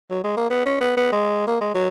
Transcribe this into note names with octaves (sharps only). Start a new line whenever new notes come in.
F#3
G#3
A#3
B3
C#4
B3
B3
G#3
A#3
G#3
F#3